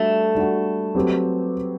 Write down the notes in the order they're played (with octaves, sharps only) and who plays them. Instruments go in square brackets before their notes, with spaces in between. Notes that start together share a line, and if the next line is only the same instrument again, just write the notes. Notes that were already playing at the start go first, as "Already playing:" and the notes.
Already playing: [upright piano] G3 D4 F#4 [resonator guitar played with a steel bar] A3
[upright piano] G3 D4 F#4
F#3 C4 G4 B4